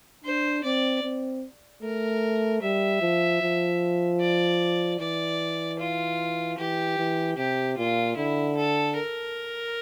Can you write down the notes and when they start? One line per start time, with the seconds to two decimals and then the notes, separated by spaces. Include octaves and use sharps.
0.24 D4 C5
0.64 C4 D5
1.04 C4
1.83 A3 A#4
2.62 G3 E5
3.01 F3
3.41 F3
4.21 D5
5.00 E3 D5
5.79 F4
6.58 E3 G4
6.98 E3
7.38 C3 G4
7.77 A#2 F4
8.17 D3 E4
8.56 A4
8.96 A#4